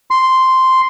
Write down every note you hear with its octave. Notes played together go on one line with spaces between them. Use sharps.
C6